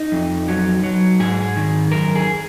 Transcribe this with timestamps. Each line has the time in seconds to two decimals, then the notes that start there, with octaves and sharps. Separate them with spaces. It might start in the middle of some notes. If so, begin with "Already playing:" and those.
Already playing: D#4
0.12 F2
0.48 F#3
0.84 F#3
1.20 G#2 G#4
1.56 D#3
1.92 F#2 A#4
2.15 G#4